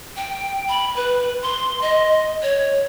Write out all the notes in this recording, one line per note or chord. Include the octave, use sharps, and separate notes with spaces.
G5
B5
B4
C6
D#5
C#5